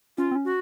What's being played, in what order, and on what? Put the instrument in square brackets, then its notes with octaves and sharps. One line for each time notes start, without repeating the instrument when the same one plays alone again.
[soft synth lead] C#4 [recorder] F4
[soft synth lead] C4
C#4
[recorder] F#4